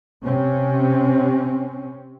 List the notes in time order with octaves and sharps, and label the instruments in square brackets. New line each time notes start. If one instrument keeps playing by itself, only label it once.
[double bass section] C3 C4 C#4